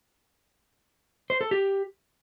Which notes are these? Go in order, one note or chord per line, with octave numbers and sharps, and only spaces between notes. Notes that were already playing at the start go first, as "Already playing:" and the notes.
C5
A4
G4